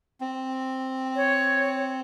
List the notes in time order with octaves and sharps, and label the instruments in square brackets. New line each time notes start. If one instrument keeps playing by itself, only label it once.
[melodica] C4
[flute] C#5